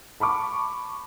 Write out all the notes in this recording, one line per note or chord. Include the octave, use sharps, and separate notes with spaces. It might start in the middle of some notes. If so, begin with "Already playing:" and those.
A5 B5 C#6 D6